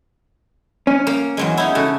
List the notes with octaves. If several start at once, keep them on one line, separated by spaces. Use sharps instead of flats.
C#4
A#3
E2 F#3 G#3
C#4 D#4 E4
C#3 F#4 A4